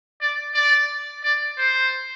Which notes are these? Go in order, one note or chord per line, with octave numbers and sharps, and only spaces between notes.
D5
D5
D5
C5